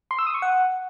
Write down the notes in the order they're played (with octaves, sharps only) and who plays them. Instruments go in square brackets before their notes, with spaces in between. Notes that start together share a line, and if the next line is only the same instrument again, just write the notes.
[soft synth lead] C6
E6
D#6
C#6
F#5